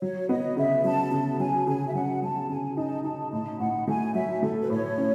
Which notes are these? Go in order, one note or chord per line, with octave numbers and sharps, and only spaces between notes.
F#3 C#5
B3 D#5
C#3 E5
F#3 A5
C#3 A5
F#3 G#5
C#3 G#5
E5
F#3 F#5
F#3 A5
C#3 G#5
D#4 A5
D#4 A5
A2 A5
A2 F#5
A3 G#5
F#3 E5
A3 A4
B4
A2 C#5
C#4